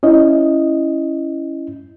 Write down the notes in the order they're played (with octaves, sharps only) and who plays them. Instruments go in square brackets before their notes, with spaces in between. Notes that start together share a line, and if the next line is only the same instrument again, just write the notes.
[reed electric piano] C#4 E4 D#5